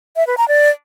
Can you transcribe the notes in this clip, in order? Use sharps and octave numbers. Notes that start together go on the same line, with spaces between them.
E5
B4
A#5
D5